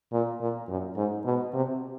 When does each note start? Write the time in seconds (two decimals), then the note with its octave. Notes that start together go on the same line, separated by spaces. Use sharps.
0.13 A#2
0.41 A#2
0.69 F#2
0.96 G#2
1.25 B2
1.54 C3